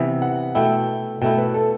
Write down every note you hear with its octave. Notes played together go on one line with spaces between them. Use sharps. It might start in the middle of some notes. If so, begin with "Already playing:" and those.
Already playing: C3 E3 B3 E4
F#5
B2 A3 E4 G5
B2 A3 E4 G5
B4
A4